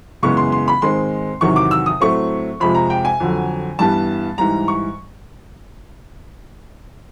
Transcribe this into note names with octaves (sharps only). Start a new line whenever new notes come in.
F#2 C#3 E3 G#3 B3 C#6
C6
C6
B5
G#2 D#3 G#3 C4 C6
E2 C3 D#3 F#3 C#6
D6
E6
D#6
A2 F#3 A3 C4 C#6
F2 C3 F3 G#3 B5
A#5
G5
G#5
F2 D3 F#3
G2 E3 G3 B3 A5
G#2 E3 G3 A#5
C#6